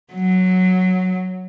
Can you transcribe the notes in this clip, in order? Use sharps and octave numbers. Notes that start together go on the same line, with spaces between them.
F#3